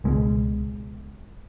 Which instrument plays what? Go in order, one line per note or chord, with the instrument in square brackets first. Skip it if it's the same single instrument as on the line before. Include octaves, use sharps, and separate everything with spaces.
[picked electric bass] C#2 B2 G#3